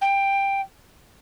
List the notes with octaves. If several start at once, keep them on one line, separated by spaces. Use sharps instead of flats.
G5